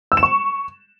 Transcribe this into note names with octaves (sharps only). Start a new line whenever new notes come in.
E6
E7
C#6